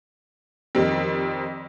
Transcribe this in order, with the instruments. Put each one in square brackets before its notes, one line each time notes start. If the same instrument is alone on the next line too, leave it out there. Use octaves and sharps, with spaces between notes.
[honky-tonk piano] F2 D#3 G3 C4